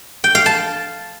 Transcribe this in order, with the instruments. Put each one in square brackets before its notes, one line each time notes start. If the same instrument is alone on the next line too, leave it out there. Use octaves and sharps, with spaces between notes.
[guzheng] G5
F5
A5